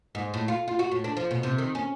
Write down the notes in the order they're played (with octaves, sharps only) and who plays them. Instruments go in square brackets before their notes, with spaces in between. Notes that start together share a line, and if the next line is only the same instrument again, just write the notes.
[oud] G#2
A2
F4
F4
F#4
A2
D4
F3
B2
C3
D#3
C#4